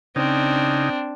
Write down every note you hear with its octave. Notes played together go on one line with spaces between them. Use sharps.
C#3 C4 D4 D#4